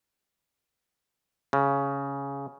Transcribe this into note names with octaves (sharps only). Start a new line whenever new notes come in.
C#3